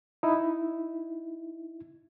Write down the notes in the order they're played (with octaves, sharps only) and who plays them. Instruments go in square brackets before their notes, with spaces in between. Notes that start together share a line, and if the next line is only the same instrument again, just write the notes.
[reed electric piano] D#4 E4